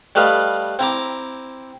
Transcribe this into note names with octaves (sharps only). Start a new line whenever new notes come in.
G3 A3 B4 D#5 F5
C4 E4 A#5 D6